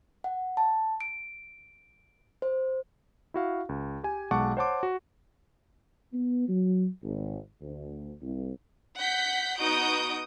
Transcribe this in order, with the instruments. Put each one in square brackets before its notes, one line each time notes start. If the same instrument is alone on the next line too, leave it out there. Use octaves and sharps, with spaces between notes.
[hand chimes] F#5
A5
D7
C5
[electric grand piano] E4 F#4 F5
C#2
G4 G#5
B1 G#3 F#5 A5 C#6 D6
C5 C#5 F#5 A5 C6 D6
F#4
[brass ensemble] B3
F#3
G#1
D2
C2
[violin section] F#5 G6 B6
B3 D#4 F#4 D#6 G6 D7